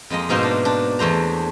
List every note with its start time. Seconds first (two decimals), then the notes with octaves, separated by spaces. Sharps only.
0.10 F2 G#3 A#3 D#5
0.29 G#2 B2 A#3 D#4 C5
0.43 D4
0.65 D4
0.99 E2 A3 C5 A#5